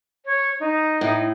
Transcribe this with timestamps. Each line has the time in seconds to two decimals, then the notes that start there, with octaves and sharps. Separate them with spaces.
0.25 C#5
0.60 D#4
1.01 A2